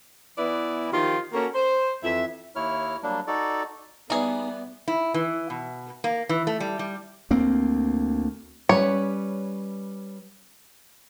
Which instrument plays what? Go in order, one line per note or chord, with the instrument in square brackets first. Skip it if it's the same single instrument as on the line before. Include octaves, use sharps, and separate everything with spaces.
[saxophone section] E3 B3 E4 B4 D5
D#3 F3 F4 G4
A#3 C#4 F#4 A4 A#4
C5
F2 E3 E5
[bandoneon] D#2 E4 C#5 F6
F#3 G3 A#3 D4
D#4 F#4 A4 D5
[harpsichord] E3 G3 [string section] B3 [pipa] D#4 G#4
[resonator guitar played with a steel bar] E4
E3
B2
A#3
E3
A3
G3
G3
[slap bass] D2 A#3 C4
[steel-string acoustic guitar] G3 C#4 B4 [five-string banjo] C#5